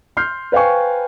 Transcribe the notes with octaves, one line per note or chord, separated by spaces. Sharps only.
C6 F6 G6 C7
B4 C5 F5 G5 G#5 C#6